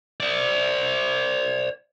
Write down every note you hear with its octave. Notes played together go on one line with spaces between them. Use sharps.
C5 D5